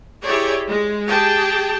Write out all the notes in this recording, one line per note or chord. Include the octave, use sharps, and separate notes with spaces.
E4 G4 G#4 C#5 D5
G#3
G4 G#4 G5 A5